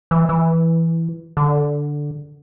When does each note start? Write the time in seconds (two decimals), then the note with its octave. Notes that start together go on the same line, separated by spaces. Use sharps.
0.11 E3
0.29 E3
1.37 D3